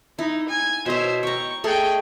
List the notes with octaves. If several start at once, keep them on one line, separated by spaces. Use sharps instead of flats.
D#4 E4
G#5
B2 C5 C#5 E5
G5 A#5 C#6
A3 G#4 A4 D#5 G5